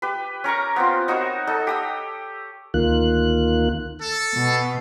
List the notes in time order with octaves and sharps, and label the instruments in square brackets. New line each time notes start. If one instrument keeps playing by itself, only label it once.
[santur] G4 B4
C#4 A#4 A#5 C#6
B3 C4 F4
D#4 F#4 A#4 C#5
D#4 A4
G4 D#6 E6
[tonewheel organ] D2 D#3 A#3 F4 F#6
[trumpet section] A4
[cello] B2